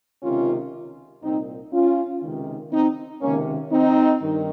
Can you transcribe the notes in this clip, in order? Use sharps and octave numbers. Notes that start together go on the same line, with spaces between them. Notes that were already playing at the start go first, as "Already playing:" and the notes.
C#2 C3 D#3 C#4 F4
C2 A#2 C4 D#4
C#4 F4
C#2 C3 D#3
C4 D#4
C#2 C3 D#3 A#3 C#4
C4 D#4
G2 D#3